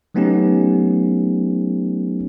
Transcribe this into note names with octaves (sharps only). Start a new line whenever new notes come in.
F#3 A3 B3 C#4 D#4 G4